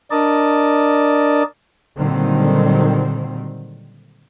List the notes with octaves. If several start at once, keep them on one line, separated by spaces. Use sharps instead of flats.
D4 A#4 D5 D#5 A5
A#2 D3 D#3 F#3 G3 C4